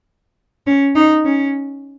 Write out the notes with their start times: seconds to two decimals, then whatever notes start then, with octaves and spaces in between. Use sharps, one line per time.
0.67 C#4
0.96 D#4
1.25 C#4